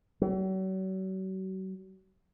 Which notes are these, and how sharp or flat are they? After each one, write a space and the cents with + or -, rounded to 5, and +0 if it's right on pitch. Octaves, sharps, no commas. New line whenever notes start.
F#3 +40